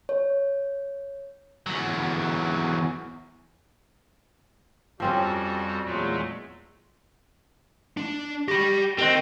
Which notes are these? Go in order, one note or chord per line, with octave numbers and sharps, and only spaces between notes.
C#5
E2 F#3
F2 F3 G3 C4 C#4 F#4 G4
E2 A#2 F#3 G#3 A3
D4
G4 B5 C#6 A#6
C4 A#4 D#5 F#6 A#6